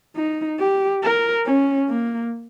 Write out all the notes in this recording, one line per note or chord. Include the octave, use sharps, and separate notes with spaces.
D#4
G4
A#4
C#4
A#3